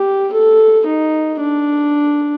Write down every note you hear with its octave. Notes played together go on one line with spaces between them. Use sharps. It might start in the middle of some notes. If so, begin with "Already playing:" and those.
Already playing: G4
A4
D#4
D4